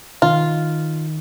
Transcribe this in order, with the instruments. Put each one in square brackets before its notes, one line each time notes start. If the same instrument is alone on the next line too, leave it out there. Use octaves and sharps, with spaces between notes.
[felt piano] D#3 [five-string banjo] F4